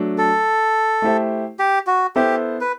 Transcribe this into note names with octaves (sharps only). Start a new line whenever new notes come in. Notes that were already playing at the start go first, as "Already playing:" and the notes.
Already playing: F#3 A3 D4
A4
A3 E4 G4 C5 E5
G4
F#4
B3 E4 G4 A4 C5 E5
B4